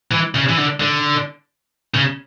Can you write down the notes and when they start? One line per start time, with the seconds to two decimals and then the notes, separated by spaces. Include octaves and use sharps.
0.11 E3
0.35 C#3
0.49 E3
0.57 D3
0.80 D3
1.94 C#3